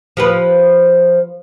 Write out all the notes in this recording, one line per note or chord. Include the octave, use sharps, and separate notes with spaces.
F3 G4 B4